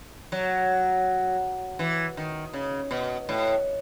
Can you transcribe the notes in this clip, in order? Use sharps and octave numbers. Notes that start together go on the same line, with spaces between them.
F#3
E3
D#3
C#3
B2
A2